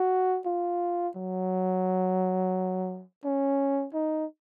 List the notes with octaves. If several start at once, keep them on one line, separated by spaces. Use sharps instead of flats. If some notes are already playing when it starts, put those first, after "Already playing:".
Already playing: F#4
F4
F#3
C#4
D#4